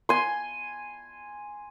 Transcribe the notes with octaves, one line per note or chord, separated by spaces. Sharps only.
G#5 C6